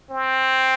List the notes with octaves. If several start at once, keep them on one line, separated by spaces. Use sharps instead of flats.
C4